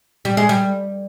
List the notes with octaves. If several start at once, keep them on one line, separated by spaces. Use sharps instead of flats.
G3
G#3
G3